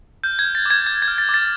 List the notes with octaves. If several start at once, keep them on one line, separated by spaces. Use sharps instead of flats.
F6 G6
G#6
F6
A6
D6 G#6
F6 G#6
G#6
F6
A6
D6
A6